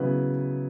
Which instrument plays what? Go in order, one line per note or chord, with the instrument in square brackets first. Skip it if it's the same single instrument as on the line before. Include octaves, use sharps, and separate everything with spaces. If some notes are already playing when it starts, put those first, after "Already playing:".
Already playing: [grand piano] C#3 F#3 B3 E4 B4